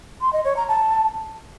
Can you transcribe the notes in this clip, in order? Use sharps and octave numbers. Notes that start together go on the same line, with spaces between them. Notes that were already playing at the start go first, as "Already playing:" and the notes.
C6
D#5
C#5
A#5
A5